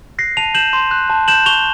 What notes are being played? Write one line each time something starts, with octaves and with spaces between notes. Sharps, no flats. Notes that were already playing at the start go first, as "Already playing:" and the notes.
F#6 A#6 C7
A5 D#7 F7
G6 E7 F#7
C6
F#6
A5
G6 E7 F#7
C#6 F7 G7